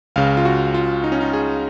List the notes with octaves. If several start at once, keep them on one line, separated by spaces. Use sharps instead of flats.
C#2 C#3 F5
F4
F#4
F4
D#4
C#4
D#4
G#4